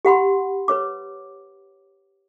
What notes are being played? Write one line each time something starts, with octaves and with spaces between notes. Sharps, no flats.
G4 F#5 B5 C6
B4 C#5 D6